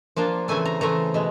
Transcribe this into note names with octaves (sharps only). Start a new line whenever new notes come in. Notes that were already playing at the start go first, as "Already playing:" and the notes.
F3 A#3 D4 F4
C#3 E3 A3 C4 G#5
A#5
C#3 E3 A3 C4 A#5
B2 G#3